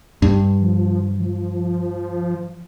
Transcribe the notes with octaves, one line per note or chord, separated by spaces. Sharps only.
G2
F3
F3